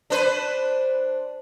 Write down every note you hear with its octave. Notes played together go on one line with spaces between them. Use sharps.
D4 B4 C5